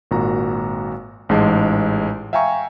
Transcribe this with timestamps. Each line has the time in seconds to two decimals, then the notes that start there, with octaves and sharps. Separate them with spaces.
0.11 G#1 A#2 F#4 A#5
1.29 A1 G#2 G#3 A5
2.33 E5 F5 G5 G#5 A#5 C#6